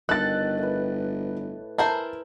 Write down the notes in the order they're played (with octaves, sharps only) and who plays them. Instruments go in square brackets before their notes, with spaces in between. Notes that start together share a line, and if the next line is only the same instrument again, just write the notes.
[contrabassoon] G1 [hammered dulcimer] D#3 C#5 G5 [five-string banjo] A4 [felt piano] F#6 A6
[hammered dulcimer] A2 B4
[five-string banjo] E4 A#4 C5 [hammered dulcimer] G#5 [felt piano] A5